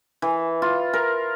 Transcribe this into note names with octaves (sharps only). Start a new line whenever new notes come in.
E3
F4
A#4